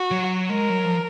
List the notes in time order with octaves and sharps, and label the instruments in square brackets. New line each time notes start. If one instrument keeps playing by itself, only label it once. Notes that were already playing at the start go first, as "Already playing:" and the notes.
Already playing: [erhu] F#4
[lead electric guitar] F#3
[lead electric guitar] G#3 [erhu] A#4
[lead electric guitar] F#3
F3